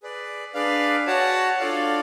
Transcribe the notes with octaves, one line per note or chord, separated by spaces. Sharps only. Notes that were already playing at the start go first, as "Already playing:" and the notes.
G#4 B4 D5
D4 G#4 B4 D5 F5
F#4 C#5 F#5 A5
D4 F4 A4 D5 F5